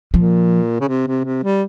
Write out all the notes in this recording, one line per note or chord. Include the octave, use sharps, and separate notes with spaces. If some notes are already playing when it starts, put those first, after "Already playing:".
A#2 F3
C#3
C3
C3
C3
G3